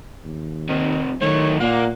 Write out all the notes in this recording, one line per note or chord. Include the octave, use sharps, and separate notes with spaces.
D#2
C3 D#3 F3
D#3 F#3 A3 C#5
A#2 A#3 F#5